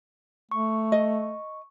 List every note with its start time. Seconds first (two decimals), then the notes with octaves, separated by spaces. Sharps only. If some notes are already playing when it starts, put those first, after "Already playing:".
0.51 A3 C#6
0.92 D#5